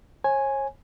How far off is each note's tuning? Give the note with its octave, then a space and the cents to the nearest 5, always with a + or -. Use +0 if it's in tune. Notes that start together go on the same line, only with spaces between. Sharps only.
C#5 -40 G#5 +0